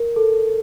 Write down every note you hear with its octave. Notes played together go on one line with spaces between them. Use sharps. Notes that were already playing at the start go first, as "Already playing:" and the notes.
Already playing: A#4
A4